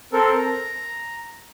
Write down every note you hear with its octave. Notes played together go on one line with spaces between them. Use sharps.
C4 A4 A#4
A#5